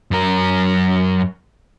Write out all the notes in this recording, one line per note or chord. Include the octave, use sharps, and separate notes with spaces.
F#2 A#4